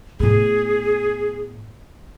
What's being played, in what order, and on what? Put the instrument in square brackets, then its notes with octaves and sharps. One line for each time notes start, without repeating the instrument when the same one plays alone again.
[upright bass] A2 B3 [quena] G#4